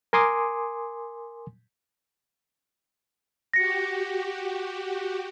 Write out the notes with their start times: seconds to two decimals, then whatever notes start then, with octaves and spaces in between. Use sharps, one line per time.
0.13 A#4 G#5 C6 D6 D#6
3.54 F#4 G4 A#6 C#7